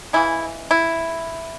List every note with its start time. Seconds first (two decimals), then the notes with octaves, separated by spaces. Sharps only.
0.13 C#3 E3 G#3 E4
0.71 E4